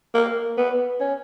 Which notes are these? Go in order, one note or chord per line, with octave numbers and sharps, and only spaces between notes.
A#3
B3
C#4